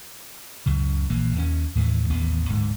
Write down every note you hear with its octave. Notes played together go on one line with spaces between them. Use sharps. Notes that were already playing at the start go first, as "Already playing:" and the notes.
C#2 F#2 C#3
A#1 E3 A#3
D#2 C#4
D#2 A2 D#3 E3
A1 D#2 B3
D1 G#2